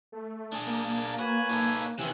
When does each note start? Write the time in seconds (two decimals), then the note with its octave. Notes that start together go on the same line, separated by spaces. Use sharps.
0.12 A3
0.52 D4 G#4
0.67 A#3
1.19 F#4 B4 C#5 G#5
1.49 D#4 A4
1.98 C3 D#3 E3 C4 C#4 F#6